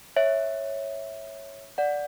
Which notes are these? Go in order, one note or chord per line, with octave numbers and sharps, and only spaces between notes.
C#5 E5
D5 F#5